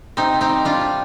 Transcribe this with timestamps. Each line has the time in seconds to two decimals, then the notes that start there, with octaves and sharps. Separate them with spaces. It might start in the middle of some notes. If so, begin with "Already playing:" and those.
0.17 C3 C4 D#4
0.34 C3
0.41 C4 D#4
0.49 G3
0.65 G3 D4 F4
0.81 C3